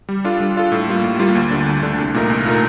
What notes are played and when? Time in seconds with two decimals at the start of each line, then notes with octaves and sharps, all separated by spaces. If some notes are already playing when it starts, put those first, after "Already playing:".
0.09 G3
0.25 D4 F4 A4
0.40 G3
0.56 D4 F4 A4
0.72 A2
0.88 G3 A#3 F4
1.04 A2
1.19 G3 A#3 F4
1.35 D2
1.51 D3 A3 D4
1.66 D2
1.83 D3 A3 D4
1.98 C2
2.14 A#2 A3 D#4 A#4
2.30 C2
2.45 A#2 A3 D#4 A#4